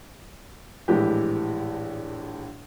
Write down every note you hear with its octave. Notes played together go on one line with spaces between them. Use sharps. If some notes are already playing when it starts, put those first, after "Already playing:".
A#1 A2 E3 G#3 G4